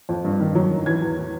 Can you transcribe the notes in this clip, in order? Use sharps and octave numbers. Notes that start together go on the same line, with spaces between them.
F2
G2
D#3
F#3
F#2
E3 G#6
E2
A2